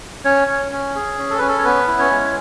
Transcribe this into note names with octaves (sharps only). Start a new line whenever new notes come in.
C#4 C#5
C#4
C#4
G#4
C#4
A4
C#4 B4
A4
C#5
B3 B4
E4
C#4 C#5
G#3